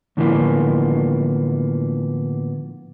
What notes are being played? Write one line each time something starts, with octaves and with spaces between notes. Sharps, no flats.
A2 D3 E3 F3 A#3 B3